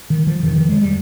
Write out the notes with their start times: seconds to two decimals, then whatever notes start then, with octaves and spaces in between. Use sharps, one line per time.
0.10 D#3
0.27 F3
0.43 F2 C3 D#3
0.56 D#3
0.69 G#3
0.81 G3